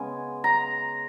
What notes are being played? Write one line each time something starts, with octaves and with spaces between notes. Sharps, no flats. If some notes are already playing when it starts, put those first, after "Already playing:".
Already playing: C#3 G#3 B3 G#5
A#5